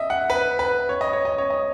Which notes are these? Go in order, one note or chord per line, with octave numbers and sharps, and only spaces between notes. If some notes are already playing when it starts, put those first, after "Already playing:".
Already playing: D#5 E5
F#5
B4
B4
C#5
D#5
C#5
D#5
C#5
D#5